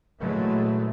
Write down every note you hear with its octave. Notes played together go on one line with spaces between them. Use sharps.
A#2 E3 F#3 G#3 A3